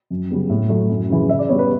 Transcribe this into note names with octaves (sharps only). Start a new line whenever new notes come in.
F#2
C#3 G3 B3
A2
F#3 A3
F#2
C#3 E3
C#3 E5
D5
G3 B3 C#5
B4